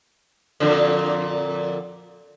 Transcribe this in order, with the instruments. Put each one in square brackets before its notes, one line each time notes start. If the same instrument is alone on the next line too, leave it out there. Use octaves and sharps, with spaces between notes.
[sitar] F2 A#2 D3